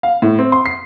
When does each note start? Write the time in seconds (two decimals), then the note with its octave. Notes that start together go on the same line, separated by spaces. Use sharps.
0.03 F5
0.22 A2
0.39 C4
0.52 C6
0.66 C7